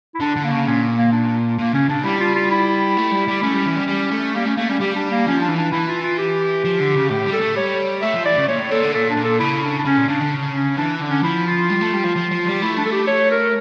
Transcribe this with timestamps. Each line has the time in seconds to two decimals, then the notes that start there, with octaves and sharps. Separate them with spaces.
0.15 E4
0.20 D3 D4
0.36 D3
0.44 A#3
0.51 C#3
0.66 A#2 C#4
0.98 A#3
1.12 D4
1.58 A#2 A#3
1.74 C#3 C#4
1.89 C#3 D4
2.04 G3 E4
2.20 F4
2.35 F4
2.51 E4
2.97 A3
3.11 G3
3.27 G3
3.43 A3 C#4
3.54 G3
3.66 E3
3.77 G3
3.88 G3
4.11 A3
4.35 G3 A#3
4.46 A3 C#4
4.57 A3 A#3
4.69 G3 C#4
4.80 G3 G4
4.96 D4
5.11 A#3
5.27 F3 C#4
5.41 D4
5.49 E3
5.57 D4
5.72 E3 E4
5.88 F4
6.03 F4
6.18 G4
6.65 F3
6.80 D3
6.95 C#3
7.10 A2 G4
7.26 G3
7.33 A4
7.41 A3
7.56 G3 C#5
8.02 A3 E5
8.14 F3
8.25 E3 D5
8.36 C#3
8.48 A#2 C#5
8.59 A2
8.71 A#2 A4
8.83 D3
8.94 A#2 A4
9.10 D4
9.17 A#2
9.24 A4
9.39 C#3 E4
9.63 D4
9.78 D4
9.85 C#3 C#4
9.97 A#2
10.08 C#3 D4
10.21 D3
10.31 C#3
10.55 C#4
10.77 E3 D4
11.01 D3
11.09 C#4
11.23 F3 E4
11.47 F4
11.70 G3
11.81 A3
11.93 G3
12.04 F3
12.16 F3
12.31 F3
12.46 G3
12.62 A3 E4
12.77 D4
12.85 A4
12.92 G4
13.07 C#5
13.31 A#4